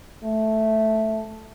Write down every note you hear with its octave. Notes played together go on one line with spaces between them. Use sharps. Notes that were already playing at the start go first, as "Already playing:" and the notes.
A3